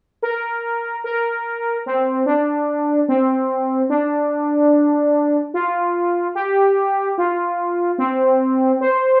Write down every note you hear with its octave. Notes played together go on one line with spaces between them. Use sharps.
A#4
A#4
C4
D4
C4
D4
F4
G4
F4
C4
C5